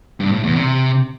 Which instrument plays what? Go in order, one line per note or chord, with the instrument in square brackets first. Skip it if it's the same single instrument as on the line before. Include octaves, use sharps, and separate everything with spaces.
[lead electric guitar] G2
A2
E2
C3